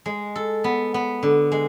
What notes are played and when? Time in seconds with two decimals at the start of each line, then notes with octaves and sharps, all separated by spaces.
0.06 G#3
0.36 A4
0.64 B3
0.94 B3
1.23 D3
1.52 G#3